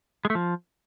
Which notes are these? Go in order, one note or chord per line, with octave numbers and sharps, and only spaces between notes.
G#3
A3
F3